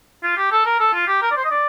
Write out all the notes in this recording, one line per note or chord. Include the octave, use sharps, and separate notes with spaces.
F4
G4
A4
A#4
A4
F4
G4
A#4
D5
C5
D#5
D5